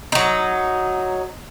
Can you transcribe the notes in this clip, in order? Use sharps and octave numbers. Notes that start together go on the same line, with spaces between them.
F#3 D#4